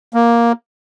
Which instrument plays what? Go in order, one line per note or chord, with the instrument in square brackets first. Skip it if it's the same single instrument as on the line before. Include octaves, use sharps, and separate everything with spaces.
[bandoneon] A#3